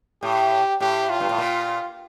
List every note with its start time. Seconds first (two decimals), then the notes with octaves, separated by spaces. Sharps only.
0.23 A2 G4
0.80 A2 G4
1.10 F4
1.20 G2
1.29 A2
1.38 A#2